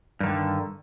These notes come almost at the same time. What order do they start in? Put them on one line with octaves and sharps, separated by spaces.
G2 D#3 D3